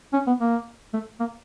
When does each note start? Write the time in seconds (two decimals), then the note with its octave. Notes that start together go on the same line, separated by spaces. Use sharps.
0.13 C#4
0.27 B3
0.40 A#3
0.94 A3
1.20 A#3